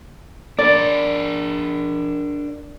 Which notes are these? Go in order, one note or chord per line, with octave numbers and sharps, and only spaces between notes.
D4 A#4 D5